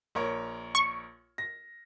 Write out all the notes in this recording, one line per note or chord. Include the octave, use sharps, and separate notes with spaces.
A#1 A#4 C#5
C#6
A#6